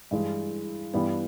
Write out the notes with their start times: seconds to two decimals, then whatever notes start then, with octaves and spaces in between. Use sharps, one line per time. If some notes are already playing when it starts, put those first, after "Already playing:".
0.11 G2 E3 G#3
0.94 G2 E3 G3 B3